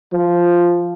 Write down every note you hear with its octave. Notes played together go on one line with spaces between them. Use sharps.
F3